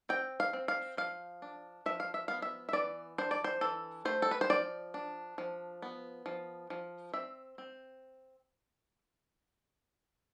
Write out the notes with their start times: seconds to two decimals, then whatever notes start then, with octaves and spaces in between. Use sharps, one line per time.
0.09 C4 G5
0.40 F5
0.53 C4
0.68 F5
0.97 F3 F5
1.42 D4
1.86 F3 E5
2.00 F5
2.14 E5
2.28 B3 F5
2.42 E5
2.69 E5
2.73 E3 D5
3.18 D4 C5
3.31 D5
3.44 C5
3.61 E3 A4
4.05 A3 C5
4.22 A4
4.31 B4
4.41 C5
4.50 F3 D5
4.94 D4
5.38 F3
5.82 B3
6.26 F3
6.70 F3
7.14 C4 E5
7.58 C4